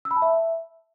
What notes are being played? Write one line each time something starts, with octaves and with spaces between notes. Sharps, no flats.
E6
B5
A5
E5